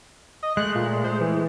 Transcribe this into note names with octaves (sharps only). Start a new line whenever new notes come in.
D#5
G#3 A3 F#6
A#2
C5
E3